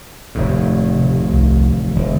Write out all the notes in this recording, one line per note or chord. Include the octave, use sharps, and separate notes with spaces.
F1 D#2 A2
C3
C2
F3
E1 E2 D3